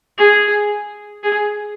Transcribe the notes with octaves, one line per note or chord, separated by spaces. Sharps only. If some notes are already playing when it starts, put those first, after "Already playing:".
G#4
G#4